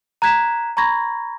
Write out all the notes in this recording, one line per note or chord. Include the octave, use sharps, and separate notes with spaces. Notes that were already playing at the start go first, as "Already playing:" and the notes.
A#5 F#6 G#6 B6 E7
A#5 B5 C#6 G#6 A#6